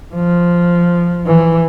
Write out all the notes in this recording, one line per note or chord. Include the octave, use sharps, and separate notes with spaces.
F3
E3